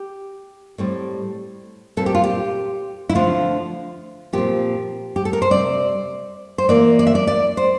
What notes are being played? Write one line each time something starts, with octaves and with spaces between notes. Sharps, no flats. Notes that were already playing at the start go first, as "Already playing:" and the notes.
Already playing: G4
A2 G3 C4
A#2 G3 C4 A4
G4
F4
G4
E4
D3 F3 A3 C4 F4
A#2 F3 C4 G4
G4
A4
A#4
C5
C3 G3 C4 D5
C5
E3 A#3 D5
D5
E5
D5
D5
C5